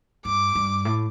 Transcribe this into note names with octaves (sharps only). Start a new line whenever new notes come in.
G2 D6
G2
A2